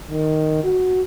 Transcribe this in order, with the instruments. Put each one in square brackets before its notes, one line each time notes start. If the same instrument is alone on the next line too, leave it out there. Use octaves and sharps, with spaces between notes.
[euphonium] D#3
F#4